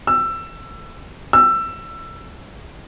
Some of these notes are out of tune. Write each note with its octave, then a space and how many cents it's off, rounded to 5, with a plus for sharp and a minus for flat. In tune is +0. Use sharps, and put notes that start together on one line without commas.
E6 +20
E6 +20